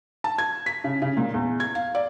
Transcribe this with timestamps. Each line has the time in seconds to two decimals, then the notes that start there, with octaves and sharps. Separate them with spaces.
0.24 A5
0.38 G#6
0.66 B6
0.84 C#3
1.02 C#3
1.17 A#2
1.34 E2
1.60 G#6
1.75 F5
1.95 D5